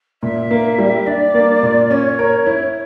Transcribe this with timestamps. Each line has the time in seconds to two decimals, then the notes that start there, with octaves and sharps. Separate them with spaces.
0.22 A#2 E5
0.51 A#3
0.78 G3
1.06 D4 D5
1.34 A#3
1.63 A#2
1.91 C#4 C#5
2.19 A#4
2.47 E4